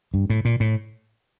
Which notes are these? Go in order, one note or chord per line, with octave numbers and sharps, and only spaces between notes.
G2
A2
A#2
A2